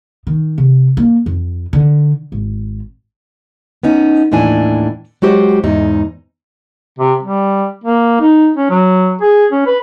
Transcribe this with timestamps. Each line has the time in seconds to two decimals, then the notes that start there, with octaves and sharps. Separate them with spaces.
0.27 D#3
0.58 C3
0.97 A#3
1.26 F2
1.73 D3
2.32 G#1
3.83 B3 C#4 D#4
4.32 D#2 A2 E3 D4 G#5
5.22 F#3 G#3 F#4 G4 C5
5.64 E2 G#2 D#4
6.99 C3
7.23 G3
7.84 A#3
8.20 D#4
8.57 C#4
8.70 F#3
9.21 G#4
9.52 C#4
9.66 B4